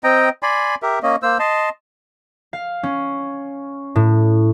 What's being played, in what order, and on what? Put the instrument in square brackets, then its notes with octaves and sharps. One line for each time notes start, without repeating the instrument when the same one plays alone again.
[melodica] C4 D#5 G5 A#5
D5 G#5 B5 C6
G4 A#4 E5
A#3 C#4 D#5
A#3 C5 E6
D#5 A5 C6
[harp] F5
C#4
A2